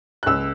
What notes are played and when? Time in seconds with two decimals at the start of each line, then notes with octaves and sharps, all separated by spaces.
0.23 F#6
0.26 C#2 E6